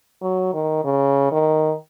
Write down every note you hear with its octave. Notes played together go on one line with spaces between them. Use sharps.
F#3
D#3
C#3
D#3